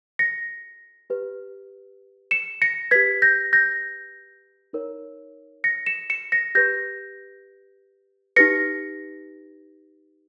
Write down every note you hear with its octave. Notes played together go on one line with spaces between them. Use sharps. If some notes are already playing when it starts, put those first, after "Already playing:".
A#6 C#7
G4 B4
C#7 E7
A#6 C#7
G4 B4 G#6 B6
G6 A#6
G6 A#6
D#4 A#4 C#5
A#6 C#7
C#7 E7
C#7 E7
A#6 C#7
G4 B4 G6 A#6
D#4 G4 B4 A#6 C#7